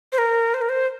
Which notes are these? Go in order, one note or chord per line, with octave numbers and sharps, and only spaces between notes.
C5
A#4
C5
A#4
C5